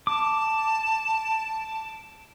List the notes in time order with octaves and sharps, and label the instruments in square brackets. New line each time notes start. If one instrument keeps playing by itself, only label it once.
[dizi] A5 [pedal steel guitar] D6